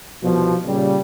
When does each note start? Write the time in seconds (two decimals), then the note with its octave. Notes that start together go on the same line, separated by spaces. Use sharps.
0.23 C2 B2 F3
0.66 A#2 C#3 G3